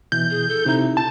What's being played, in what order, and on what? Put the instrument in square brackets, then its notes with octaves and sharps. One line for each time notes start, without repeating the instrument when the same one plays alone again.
[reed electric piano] B2 E3 [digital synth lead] G6
[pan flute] G#4
A4
[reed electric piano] C3 E4 [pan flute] D#4
[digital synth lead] A5